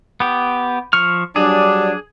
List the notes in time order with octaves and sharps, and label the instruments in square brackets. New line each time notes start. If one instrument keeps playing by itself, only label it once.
[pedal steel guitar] B3 G4
F3 C#6 F6
[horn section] F#3 G3 D4 [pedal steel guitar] G#4